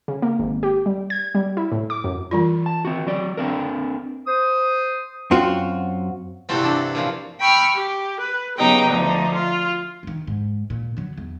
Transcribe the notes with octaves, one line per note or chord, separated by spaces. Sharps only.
C#3
A#3
G#1
G4
G3
G#6
G3
E4
A2
D6
F#2
E3 G3 F4
A5
C4 F#4
F#3 D5
C4 D4 A#4
C5 D#6
F#2 C4 F4 F#4
G2 C3 E3 C4 F#4 A4
D4 A4
A#2 C#3 F3
G5 B5 C#6 E6 F6
G4
B4
C#3 F#3 B3 D#4 G4 G5
D2 F3 D#4
F4
F#1 D#3
G#2
A#2
D3 F#3
E2